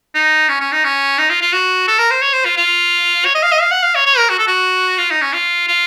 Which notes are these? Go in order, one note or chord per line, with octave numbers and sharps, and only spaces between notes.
D#4
C#4
C#4
D#4
C#4
D#4
F4
F4
F#4
A4
A#4
C5
C#5
C5
F4
F4
C#5
D#5
F5
D#5
F5
F#5
F5
C#5
C#5
A#4
F#4
A4
F#4
F4
D#4
C#4
F4
F4